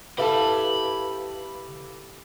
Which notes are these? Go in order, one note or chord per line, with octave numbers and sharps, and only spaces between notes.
E4 G4 A4 B4 F5 A5 B5